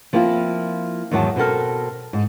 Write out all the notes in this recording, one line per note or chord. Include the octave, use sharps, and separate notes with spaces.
F3 A#3 C4 E4 F4
E2 G#2 D#3 F#3 F#5 A5
B2 C4 F#4 A4 A#4
G#2